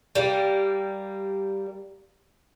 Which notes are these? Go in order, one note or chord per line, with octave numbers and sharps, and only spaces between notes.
G3 A#3